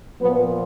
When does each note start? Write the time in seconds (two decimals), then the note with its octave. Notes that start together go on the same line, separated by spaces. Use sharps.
0.21 A#2 F3 B3